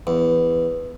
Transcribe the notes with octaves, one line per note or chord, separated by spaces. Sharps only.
E2